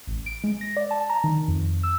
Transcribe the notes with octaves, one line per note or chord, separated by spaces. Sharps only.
A1
D7
G#3
A#6
D5
A5
A#5
D#3
F2
E6